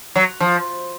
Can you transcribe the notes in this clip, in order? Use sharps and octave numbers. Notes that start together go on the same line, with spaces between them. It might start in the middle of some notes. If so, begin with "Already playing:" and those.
F#3
F3